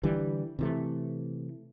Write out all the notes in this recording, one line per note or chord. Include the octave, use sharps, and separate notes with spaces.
D3 E3 G3
C3 E3 A3